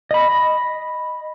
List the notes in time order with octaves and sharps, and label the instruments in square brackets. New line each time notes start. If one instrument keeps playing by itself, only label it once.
[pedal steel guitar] D#5 B5